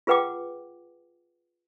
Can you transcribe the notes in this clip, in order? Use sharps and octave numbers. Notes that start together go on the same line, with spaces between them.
F4 G#4 B4 F#5 G5 D6